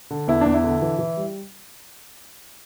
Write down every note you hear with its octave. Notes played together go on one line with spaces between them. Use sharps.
D3
E2 E4
E2 D4
E4
D3
E3
E3
G3